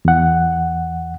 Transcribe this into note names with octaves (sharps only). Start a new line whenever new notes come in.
E2 F#5